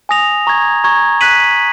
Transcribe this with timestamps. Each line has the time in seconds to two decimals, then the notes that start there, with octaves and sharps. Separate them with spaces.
0.09 G#5 D#6 A#6 F7
0.47 A#5 C#6 G#6
0.84 A#5 C#6 G#6
1.21 F#6 B6 D#7 F#7